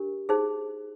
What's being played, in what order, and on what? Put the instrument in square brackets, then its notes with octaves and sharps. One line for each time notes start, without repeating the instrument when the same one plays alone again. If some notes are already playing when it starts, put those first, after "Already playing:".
Already playing: [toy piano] D4 G4 A#4
D#4 G#4 C5